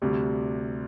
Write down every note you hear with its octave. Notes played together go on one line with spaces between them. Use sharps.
D2 C3 G3